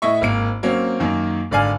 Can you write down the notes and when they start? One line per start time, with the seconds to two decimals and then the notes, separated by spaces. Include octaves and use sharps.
0.02 A2 E4 D#5 E5 C#6
0.21 G#1 A#3 D7
0.63 F#3 A#3 C4 C#4
1.00 F#2 D#3 A#3
1.51 G#1 D3 D5 F5 G#5 F6